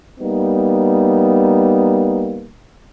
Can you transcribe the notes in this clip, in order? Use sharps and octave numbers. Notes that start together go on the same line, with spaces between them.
G3 A#3 B3 D#4